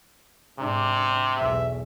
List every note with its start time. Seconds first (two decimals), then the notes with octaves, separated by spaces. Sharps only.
0.58 G#2 C3 D4
1.37 B1 E2 E5